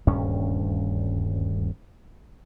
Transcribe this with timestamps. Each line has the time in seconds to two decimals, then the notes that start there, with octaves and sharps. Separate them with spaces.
0.07 D#1 D2 G2 C#4